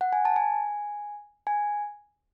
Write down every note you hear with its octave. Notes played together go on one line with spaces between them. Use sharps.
F#5
G#5
A5
G#5
G#5